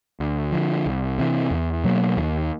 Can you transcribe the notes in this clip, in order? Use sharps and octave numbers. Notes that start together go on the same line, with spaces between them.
D2
D3 F3
C2
C3 E3
E2
B2 F#3 A#3
D#2